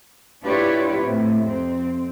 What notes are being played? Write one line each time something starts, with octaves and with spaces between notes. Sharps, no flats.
D4 E4 F4 G4 B4 C#5
A2 C3
F2 C4